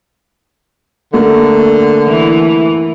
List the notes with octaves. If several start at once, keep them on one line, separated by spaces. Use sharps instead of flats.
D3 A3 A#3
E3